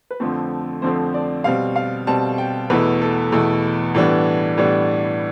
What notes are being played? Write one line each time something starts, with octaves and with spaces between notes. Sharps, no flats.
B4
F2 D3 F3 A3 C4 A4
F2 D3 F3 A3 C4 C5
D5
B2 G3 C4 F5
F5
B2 G3 C4 A5
G5
E2 B2 A3 E4 B4
A4
E2 B2 A3 E4
A2 E3 G3 B3 D4
A2 E3 G3 B3 D4